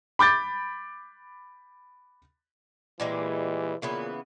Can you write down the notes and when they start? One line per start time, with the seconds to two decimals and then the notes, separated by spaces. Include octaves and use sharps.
0.19 B5 D6 G6 A6
3.00 A#2 E3 G3 G#3
3.82 A#2 C#3 E3 B3